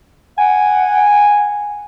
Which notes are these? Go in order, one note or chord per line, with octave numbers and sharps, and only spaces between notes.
F#5 G#5